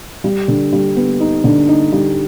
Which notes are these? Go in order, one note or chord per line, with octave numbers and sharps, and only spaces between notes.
G3
D3
G3
B3
D#4
D3
D#4
G3